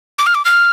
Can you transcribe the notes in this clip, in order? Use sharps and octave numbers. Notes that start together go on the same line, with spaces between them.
D6
F6
D6
F6